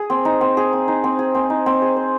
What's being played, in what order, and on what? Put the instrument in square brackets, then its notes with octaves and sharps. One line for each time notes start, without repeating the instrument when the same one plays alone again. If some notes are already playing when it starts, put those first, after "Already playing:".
Already playing: [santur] G#4
C4
D#4
C4
G#4
C4
D#4
C4
G#4
C4
D#4
C4
G#4
C5